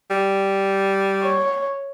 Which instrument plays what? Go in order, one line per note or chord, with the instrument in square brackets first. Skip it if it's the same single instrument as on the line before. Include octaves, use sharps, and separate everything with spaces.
[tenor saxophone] G3
[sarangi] C#5